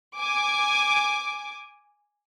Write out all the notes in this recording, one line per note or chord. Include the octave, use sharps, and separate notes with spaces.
G#5 D6